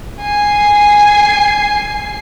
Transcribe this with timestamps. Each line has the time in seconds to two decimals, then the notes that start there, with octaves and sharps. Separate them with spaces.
0.21 G#5 C7